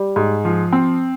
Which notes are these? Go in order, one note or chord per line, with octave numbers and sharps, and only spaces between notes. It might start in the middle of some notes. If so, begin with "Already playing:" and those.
Already playing: G3
G#2
F3
C4